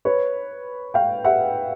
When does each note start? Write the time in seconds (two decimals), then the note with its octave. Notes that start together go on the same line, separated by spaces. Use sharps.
0.05 B4 C#5
0.94 F5 G5
1.24 E5 F#5